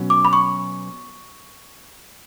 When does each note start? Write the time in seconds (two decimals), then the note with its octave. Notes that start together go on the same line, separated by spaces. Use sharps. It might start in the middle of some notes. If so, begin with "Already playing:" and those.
Already playing: B2 F#3 C#4
0.10 D6
0.25 B5
0.33 C#6